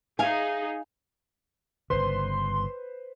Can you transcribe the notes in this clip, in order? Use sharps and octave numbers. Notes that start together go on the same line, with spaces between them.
D#4 G#4 F5 G#5
G1 C#3 B4 C5 C6